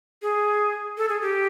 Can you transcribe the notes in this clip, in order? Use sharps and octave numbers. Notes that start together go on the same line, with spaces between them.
G#4
A4
G#4
G4